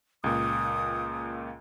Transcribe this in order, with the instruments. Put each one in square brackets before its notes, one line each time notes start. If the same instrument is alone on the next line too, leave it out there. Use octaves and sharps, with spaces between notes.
[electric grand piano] C#2 A#2 [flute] D#6